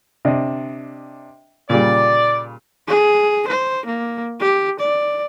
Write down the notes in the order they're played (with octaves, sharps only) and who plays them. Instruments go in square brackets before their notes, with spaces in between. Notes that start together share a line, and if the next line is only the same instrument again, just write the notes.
[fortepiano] C3 D4 D#5
[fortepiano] A#2 C#3 G3 [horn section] D5
[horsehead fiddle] G#4
C5
A#3
G4
D5